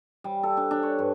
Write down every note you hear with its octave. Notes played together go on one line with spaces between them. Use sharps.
G3
A4
D4
D4
C#5
G2